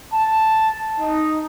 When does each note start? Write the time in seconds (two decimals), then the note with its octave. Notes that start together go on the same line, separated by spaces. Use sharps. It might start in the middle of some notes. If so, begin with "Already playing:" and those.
0.13 A5
0.99 D#4